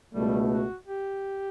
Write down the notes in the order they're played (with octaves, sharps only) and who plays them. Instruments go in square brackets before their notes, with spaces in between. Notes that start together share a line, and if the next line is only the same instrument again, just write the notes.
[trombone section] C#2 B2 A3 [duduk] G3
[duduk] F#4
G4